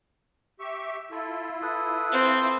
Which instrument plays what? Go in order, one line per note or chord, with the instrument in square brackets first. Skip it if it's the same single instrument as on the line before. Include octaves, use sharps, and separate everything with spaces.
[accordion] G4 E5 C#6
[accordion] E4 F4 [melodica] A4
[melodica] A4 B4 D#6
[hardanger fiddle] C4